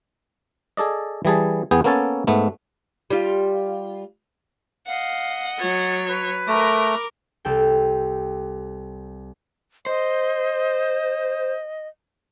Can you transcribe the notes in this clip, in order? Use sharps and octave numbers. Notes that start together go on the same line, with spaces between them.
G#4 A4 D5 D#5
E3 G3 G#4 A5
E2 B3 G#4 G5
A#3 B3 C#4 A4 C#5 A5
G#2 A3 B3
G3 F4
D#5 F5 F#5
F#3 C#5 A6
B4
A3 A#4 A#5 B5 D6
C2 A4 G5
C5 D#5